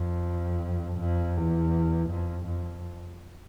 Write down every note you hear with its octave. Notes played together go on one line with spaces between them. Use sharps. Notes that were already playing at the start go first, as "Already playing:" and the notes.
Already playing: F2
F2
E2
F2
F2